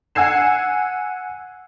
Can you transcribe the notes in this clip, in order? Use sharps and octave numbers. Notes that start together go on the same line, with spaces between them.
F#5 G#5 E6 G#6 C7 E7